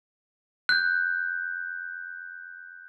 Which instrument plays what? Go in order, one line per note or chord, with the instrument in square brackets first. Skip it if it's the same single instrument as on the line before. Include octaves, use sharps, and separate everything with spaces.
[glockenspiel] F#6 G6